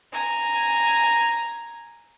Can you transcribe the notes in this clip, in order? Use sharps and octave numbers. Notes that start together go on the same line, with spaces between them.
G#5 A#5